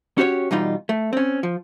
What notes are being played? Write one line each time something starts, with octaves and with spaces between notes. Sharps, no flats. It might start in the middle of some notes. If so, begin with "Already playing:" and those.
C#4 F#4 G4 C5 C#5
B2 E3 G3 D#4 F4
A3
C4 C#4
F3